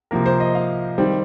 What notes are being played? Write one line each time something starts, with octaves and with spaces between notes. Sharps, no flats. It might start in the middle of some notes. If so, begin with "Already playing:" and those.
C3 F3 A#3 A#4
C5
D#5
F5
D#3 G3 C4